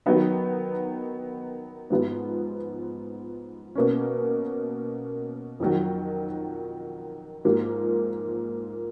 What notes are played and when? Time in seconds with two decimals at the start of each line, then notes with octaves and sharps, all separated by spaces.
0.06 D#3 F#3 B3 D#4
1.90 G#2 F3 B3
3.75 B2 A#3 C#4
5.60 F2 D#3 F#3
7.45 G#2 F3 A#3